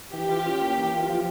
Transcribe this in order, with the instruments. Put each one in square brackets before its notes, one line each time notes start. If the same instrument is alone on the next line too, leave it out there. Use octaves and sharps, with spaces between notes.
[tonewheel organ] E3 [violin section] G4
[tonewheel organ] F4
C#4
A#3
E3
F4
F3